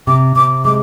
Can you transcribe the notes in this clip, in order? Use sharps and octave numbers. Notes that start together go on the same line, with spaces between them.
C3 D6
C3 D6
G#3 D6